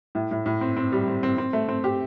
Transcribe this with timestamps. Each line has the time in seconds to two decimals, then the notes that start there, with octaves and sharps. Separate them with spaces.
0.15 A2
0.31 A2
0.46 A2
0.61 C4
0.77 C4
0.92 G3
1.08 C4
1.23 C4
1.38 C4
1.53 A3
1.69 C4
1.84 G4